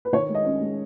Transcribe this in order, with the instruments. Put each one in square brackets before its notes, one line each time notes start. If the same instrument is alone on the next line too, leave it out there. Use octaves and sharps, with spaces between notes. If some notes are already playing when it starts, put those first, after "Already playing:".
[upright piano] B4
D#3 C#5
G#3
D#5
C#4
G#3